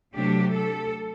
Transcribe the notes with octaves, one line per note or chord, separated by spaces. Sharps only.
C3 F#3 A3 D4 G4
A4